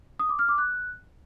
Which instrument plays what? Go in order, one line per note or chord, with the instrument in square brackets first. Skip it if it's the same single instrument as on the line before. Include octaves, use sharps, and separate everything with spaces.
[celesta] D#6
D6
F6
D6
F#6